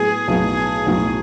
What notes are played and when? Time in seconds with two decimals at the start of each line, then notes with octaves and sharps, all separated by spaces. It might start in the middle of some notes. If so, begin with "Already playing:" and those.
Already playing: A2 F#3 B3 G#4
0.28 B1 A2 F#3 B3
0.86 B1 A2 F#3 B3